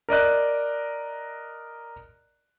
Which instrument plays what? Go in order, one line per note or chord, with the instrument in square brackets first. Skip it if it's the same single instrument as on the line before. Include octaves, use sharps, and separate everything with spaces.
[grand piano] A#4 D5 D#5 F#6